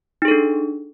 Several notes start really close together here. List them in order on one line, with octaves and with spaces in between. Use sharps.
D#4 G#4 A4 D4